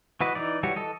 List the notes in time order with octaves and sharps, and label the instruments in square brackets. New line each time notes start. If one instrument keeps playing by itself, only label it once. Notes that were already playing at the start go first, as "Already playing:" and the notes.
[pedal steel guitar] E3 F#4 B4 D#5
E3 D#4 D5
E3 G3 F#4 G4 C#5
E3 A4 D#5